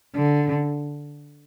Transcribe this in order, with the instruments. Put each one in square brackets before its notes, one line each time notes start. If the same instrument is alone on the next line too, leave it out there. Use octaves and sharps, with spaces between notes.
[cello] D3